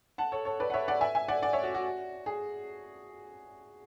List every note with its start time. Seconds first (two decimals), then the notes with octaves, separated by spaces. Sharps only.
0.18 F#5 A5
0.32 A4 C#5
0.45 A4 C#5
0.60 B4 D5
0.70 F#5
0.73 C#5 E5
0.88 D5 F#5
1.01 E5 G#5
1.15 E5 G#5
1.28 D5 F#5
1.42 D5 F#5
1.53 C#5 E5
1.63 F#4
1.74 F#4
2.26 G#4